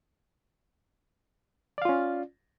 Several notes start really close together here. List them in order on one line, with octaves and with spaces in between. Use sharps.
D5 F5 F4 C#4